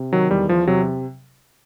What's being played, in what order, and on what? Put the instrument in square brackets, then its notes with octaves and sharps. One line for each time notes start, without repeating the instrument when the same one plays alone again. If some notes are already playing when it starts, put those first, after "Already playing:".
Already playing: [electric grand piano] C3
D#3 F#3
E2 G3
E2 F3
C3 F#3